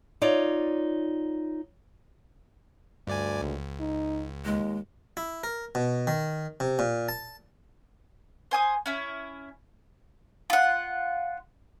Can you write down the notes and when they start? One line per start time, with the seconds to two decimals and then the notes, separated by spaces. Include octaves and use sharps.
0.21 D#4 F4 C#5 D5
3.07 D2 G2 D5 G#5
3.42 C#2
3.80 D#4
4.45 D#2 G#3
5.17 E4
5.44 A#4
5.75 B2
6.07 D#3
6.60 C3
6.79 A#2
7.09 A5
8.51 C5 G#5 D#6
8.86 C#4 E4
10.50 F4 F#5